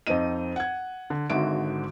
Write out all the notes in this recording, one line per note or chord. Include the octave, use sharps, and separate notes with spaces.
F2 C4 D#4 D#5 D#7
F#5 G#6
D3
G#1 G#2 D3 F#4 E5 D7